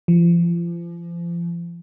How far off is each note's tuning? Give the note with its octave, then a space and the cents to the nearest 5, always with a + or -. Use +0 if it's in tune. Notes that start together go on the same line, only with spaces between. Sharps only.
F3 -35